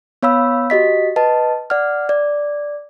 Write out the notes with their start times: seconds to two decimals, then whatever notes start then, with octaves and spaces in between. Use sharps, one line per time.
0.23 B3 C#5 F5 B5 E6
0.70 F#4 G4 D#5 B6
1.16 B4 D#5 A5
1.70 D5 F#5 F6
2.09 D5